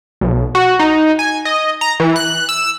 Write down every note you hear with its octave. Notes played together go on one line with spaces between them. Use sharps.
B1
F#4
D#4
G#5
D#5
A#5
E3
F#6
E6